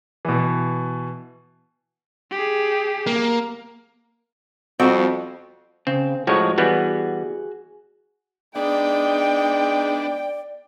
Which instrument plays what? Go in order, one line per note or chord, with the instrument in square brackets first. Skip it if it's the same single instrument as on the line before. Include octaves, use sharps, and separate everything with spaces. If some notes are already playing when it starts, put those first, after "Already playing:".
[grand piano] B2 E3
[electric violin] G4 G#4
[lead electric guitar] A#3
[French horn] F2 [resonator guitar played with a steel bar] G3 C4 F#4
[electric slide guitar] C#3 [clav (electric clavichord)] C4
[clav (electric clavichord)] A2 F3 G#3 [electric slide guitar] F#4 C#5
[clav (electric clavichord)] E3 G3 B3 [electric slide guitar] F#4 G#4
[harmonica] G#3 D#4 [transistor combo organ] B3 D4 [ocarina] D5 [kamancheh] G5